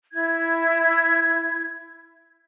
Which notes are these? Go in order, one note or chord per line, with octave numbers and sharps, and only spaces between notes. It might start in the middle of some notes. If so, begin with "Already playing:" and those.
E4 G#6